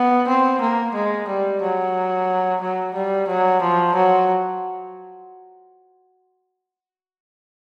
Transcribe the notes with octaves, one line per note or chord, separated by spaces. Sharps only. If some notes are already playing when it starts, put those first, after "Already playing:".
Already playing: B3
C4
A#3
G#3
G3
F#3
F#3
G3
F#3
F3
F#3